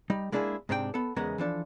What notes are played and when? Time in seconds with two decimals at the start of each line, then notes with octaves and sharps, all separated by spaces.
0.10 G3 D#4
0.32 G#3 A#3 D4 E4 G4 G#4
0.69 G#2 C3 C4 D4 F#4 G5
0.94 B3 A4
1.16 E2 C#3 G#3 B3 A#4 F#5
1.38 E3 F3 D4 A4